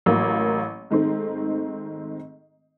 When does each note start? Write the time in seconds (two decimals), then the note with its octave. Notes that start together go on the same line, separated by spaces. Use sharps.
0.06 A1 F#3 A#3
0.91 G#2 D#3 A3 C4